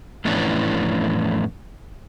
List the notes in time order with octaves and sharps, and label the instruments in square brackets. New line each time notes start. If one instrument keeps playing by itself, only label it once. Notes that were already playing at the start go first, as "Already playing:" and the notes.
[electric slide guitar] F2 A2 E3 B3 C#4 D4